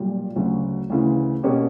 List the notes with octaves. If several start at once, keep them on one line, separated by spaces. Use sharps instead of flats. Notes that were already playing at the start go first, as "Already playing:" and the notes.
Already playing: B1 A#2 G3
D2 C#3 F#3
D2 C#3 E3
B2 A#3 C#4 G4